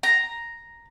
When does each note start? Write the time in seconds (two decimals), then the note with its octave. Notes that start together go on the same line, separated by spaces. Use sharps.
0.03 A#5